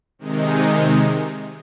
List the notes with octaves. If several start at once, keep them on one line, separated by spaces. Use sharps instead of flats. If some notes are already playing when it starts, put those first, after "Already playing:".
C3 D#3 G#3 D#4